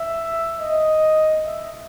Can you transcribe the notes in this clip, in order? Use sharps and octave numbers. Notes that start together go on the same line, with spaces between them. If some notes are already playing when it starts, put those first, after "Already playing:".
Already playing: E5
D#5
E5